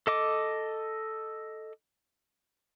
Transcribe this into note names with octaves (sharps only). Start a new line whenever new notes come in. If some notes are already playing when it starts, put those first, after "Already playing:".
A4 D#5 D6